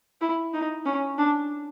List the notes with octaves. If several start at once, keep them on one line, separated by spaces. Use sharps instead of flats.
E4
D#4
C#4
D4